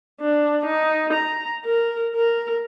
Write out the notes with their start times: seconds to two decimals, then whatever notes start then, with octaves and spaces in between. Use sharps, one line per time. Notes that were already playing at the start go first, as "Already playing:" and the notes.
0.20 D4
0.65 D#4
1.13 A#5
1.65 A#4
2.16 A#4